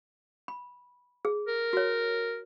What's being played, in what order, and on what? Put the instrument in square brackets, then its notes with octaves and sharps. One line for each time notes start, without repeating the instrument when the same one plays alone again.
[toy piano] B5
G#4
[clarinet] A#4
[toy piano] F#4 C#5